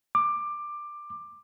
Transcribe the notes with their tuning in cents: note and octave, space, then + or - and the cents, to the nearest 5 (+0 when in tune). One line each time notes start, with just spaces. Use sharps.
D6 +15